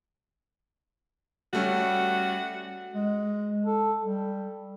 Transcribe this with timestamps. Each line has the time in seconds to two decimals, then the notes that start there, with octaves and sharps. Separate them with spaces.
1.53 G3 A3 C#4 F#4
2.94 G#3
3.66 A4
4.03 G3